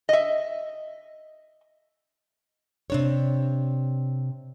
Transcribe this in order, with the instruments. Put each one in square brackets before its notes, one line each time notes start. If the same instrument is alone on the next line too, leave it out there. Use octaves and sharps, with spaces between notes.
[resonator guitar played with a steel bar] D#5 E5
[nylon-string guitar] C3 D4 C#5